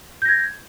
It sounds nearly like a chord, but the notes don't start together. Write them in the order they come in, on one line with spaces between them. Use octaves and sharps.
G6 A#6 G#6